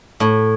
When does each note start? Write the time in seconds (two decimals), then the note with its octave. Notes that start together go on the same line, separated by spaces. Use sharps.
0.20 A2